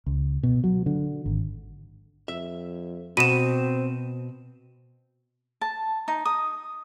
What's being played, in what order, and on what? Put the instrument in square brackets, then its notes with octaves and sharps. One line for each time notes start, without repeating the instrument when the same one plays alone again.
[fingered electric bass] C#2
B2
F#3
D3
G#1
[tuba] F2 [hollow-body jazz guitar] E5
[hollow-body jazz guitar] B2 F#4 B5 [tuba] C4 [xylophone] D#7 E7
[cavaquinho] A5
D#4
D#6